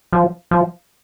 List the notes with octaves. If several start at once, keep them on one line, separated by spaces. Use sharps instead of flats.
F3
F3